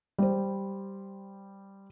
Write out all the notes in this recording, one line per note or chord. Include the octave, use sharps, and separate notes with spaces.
G3 C5